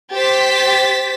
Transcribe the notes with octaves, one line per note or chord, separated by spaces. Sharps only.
G4 C5 A6 B6